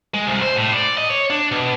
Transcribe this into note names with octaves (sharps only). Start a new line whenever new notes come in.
G#3
C2
C5
A2
D5
D#5
C#5
D4
B2